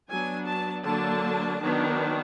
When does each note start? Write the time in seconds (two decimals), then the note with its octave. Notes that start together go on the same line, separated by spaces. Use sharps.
0.10 F#3 B3 D4 G#5
0.47 A5
0.85 D3 F#3 A#3 D4 A5
1.59 D#3 F#3 B3 D4